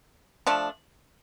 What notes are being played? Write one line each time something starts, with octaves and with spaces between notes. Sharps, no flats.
F3 A3 D4